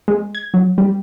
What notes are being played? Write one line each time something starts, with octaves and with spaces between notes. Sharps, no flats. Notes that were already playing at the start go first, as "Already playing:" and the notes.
G#3
G#6
F#3
G3